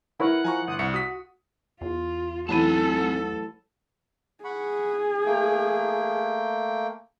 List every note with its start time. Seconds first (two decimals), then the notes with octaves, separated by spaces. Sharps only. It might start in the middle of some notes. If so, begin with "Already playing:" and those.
0.20 E4 A#4 B4 C#5 F#5
0.44 F3 G#5 A#5 C#6
0.68 G1 D#6
0.79 C2 C#6 C#7
0.94 F#4 D#6 B6
1.81 E2 F4
2.49 A1 F#3 C4 D#4 A4 A5 B5 D#7
4.44 G#4 F#5 B5 C#6
5.26 A3 A#3 G5